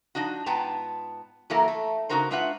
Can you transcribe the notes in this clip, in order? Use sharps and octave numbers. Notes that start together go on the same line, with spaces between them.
F3 D4 D#4 F#4
G#2 B3 F4 G5 A5 A#5
E3 F#3 A#3 E4 A4 A#4
A3
C#3 G3 D#4 F#4 A#4 C5
G#3 D4 F4 B4 E5 F#5